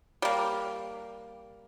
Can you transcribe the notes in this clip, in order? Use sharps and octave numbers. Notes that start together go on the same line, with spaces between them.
G3 A#3